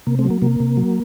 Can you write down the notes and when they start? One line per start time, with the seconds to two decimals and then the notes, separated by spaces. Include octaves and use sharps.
0.07 C3 A#3
0.19 A3 C4
0.24 F#3
0.30 A#3
0.42 C3 A#3
0.60 C3
0.77 F#3